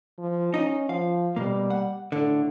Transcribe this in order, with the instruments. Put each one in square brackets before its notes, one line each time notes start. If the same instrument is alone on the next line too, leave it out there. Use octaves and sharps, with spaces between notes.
[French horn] F3
[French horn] C#4 [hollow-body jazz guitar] D#4 D#5
[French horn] F3 [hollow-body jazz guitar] F5
[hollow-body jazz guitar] B2 A#3 [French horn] G3
[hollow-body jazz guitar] F#5
[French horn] A2 [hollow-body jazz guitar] D3